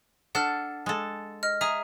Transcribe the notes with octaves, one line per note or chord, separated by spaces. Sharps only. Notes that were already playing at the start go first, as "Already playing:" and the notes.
D4 A4 F#5 F6
G#3 A4
D#5 F6
G#4 E5 A#5 D#6